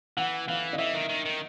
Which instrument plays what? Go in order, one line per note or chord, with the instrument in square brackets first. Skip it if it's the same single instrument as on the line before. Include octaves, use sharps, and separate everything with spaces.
[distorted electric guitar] E3 [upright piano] F#5
[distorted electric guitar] E3 [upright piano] F5
[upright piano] D#5
[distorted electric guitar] E3 [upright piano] E5
[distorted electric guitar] D#3
D#3
D#3